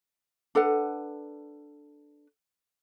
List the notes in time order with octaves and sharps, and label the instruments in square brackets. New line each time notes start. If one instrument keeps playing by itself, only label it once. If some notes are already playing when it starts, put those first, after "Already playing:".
[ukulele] D4 A4 B4 F#5